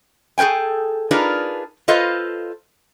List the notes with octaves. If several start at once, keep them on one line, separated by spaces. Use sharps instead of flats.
G#4 A4 B4 G5 G#5
D4 D#4 F4 G#4 A#4 B4
F4 A4 B4 C5 D#5 F5